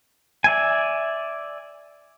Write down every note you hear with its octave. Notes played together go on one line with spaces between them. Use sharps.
D5 E5 G#5